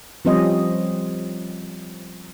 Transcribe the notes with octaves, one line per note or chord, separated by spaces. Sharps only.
F3 G3 C4 C#4 C5 D#5